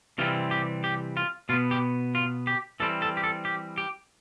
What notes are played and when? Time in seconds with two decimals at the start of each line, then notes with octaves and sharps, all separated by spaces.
0.18 C3 E3 G3 C4 F4
0.51 G4
0.84 G4
1.17 F4
1.49 B2 F4
1.53 B3
1.71 G4
2.15 F4
2.47 G4
2.80 E3 G3 C4 A4
3.02 A4
3.17 G4
3.24 A4
3.45 G4
3.78 G4